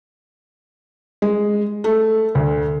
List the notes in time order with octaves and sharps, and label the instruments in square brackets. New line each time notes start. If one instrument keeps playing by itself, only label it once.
[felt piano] G#3
A3
D2